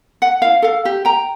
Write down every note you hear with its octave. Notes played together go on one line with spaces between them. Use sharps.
F#5
E4 F5
A4 F5
G4
G5 A#5